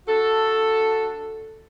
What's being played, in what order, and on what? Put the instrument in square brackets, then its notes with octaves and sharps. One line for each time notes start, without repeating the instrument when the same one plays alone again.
[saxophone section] D4 F#4 A4